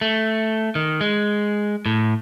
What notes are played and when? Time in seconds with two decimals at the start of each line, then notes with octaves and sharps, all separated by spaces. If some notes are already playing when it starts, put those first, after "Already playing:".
0.01 A3
0.75 D#3
1.01 G#3
1.86 A2